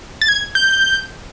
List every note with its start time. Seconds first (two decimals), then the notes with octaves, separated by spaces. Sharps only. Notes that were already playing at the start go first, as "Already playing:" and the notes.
0.21 A6
0.28 G#6
0.55 G6